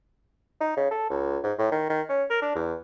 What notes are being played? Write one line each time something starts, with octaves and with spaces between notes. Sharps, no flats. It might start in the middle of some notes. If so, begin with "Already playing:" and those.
D#4
C#3
A4
C#2
G#2
A2
D#3
D#3
C#4
A#4
D4
E2